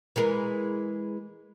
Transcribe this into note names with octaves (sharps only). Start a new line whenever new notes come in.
E3 G#3 A#4